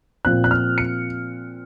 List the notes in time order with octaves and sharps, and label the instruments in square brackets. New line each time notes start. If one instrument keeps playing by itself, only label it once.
[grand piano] A#2 F3 C4 F#6
F#6
F6
C#7